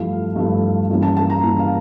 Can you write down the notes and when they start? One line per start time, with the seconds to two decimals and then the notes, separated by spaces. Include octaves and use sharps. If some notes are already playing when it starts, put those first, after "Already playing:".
Already playing: G2 F3 A3 E4 F5
0.36 G2 F3 A3 E4
0.90 G2 E3 A#3 C#4 E4
1.03 A5
1.17 A5
1.30 A#5
1.43 G2 E3 A#3 C#4 E4
1.59 F5